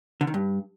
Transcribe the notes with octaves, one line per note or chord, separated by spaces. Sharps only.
D3
D#3
G2